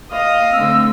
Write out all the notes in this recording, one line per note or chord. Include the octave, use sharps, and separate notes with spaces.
D#5 F5
D3 A3 C4 E6